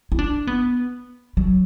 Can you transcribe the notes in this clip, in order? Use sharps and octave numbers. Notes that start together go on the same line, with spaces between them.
E4
D4
B3
F#3